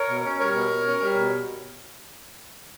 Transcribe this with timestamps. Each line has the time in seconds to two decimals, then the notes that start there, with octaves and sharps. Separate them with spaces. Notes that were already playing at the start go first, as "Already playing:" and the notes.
Already playing: A#4 C#5
0.09 B2
0.25 C#4
0.39 G3 A#4 C#5
0.55 B2
0.71 B2
0.86 C#4
1.02 G3
1.17 B2